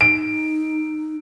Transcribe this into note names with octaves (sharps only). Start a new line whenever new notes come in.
D#4 D7